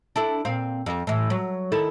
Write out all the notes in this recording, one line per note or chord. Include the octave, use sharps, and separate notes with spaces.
D4 E4 A4
A#2 C4 F5
F2
A2 E3
F#3
D#3 E4 A4